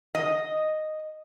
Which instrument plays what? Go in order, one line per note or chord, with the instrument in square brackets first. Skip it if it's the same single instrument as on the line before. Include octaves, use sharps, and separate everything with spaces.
[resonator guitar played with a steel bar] D#5